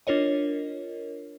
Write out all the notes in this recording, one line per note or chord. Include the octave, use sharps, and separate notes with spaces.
D4 F4 A#4 C#5 D#5